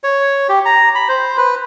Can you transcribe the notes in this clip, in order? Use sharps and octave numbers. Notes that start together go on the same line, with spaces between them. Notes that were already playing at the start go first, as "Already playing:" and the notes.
C#5
G4
A#5
B5
C5
B4